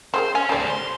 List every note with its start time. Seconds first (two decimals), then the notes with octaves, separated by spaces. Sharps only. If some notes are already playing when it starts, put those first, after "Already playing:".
0.14 C4 G#4 A#4 C5
0.35 C#4 G#5
0.49 C#3 G3 A4 C5 D5
0.70 C6